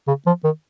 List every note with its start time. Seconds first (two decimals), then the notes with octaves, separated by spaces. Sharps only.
0.08 C#3
0.26 F3
0.44 D#3